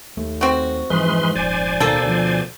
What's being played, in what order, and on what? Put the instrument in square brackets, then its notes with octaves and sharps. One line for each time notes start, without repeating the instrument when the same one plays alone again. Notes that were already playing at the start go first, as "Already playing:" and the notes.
[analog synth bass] D#2 [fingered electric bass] A3
[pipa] C4 F#4
[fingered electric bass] F2 G#2 [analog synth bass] E3 [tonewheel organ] G#3 B4 C6
[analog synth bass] D#1 [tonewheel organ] C5 D5 G#5
[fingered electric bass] D1 D#3 [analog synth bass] B2 [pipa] A#3 A4
[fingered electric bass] D2 F3